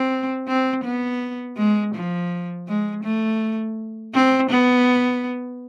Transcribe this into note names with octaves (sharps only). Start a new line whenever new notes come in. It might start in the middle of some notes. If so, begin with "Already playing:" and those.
Already playing: C4
C4
B3
G#3
F3
G#3
A3
C4
B3